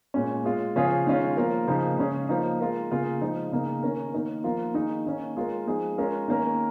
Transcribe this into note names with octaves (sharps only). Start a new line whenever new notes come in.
A#2 G#3 C#4
G#3 F4 G#4
C#3 F3 C#4 F4 G#4
D#3 G#3 C#4 F4
F3 A#3 F4 A#4
C#3 F3 A#3 D#4
C#3 G#3 C#4 G#4
F3 A#3 D#4
G#3 F4 A#4
C#3 A#3 F4 G#4
F3 G#3 D#4
C#3 A#3 D#4 A#4
D#3 C#4 A#4
D#3 A#3 D#4 A#4
F3 A#3 F4 A#4
D#3 A#3 D#4 G#4
D#3 A#3 C#4
G#3 F4 A#4
F3 G#3 D#4 G#4
G#3 C#4 F4 A#4
D#3 A#3 C#4 A#4